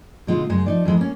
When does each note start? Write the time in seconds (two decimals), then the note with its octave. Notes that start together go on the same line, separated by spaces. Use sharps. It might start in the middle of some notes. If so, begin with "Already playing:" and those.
0.27 B2 D3 G#3 D#4 F4
0.50 F#2 C#3 G#3
0.66 F3 D#4 D5
0.85 F2 E3 G#3
0.97 A#3 C#4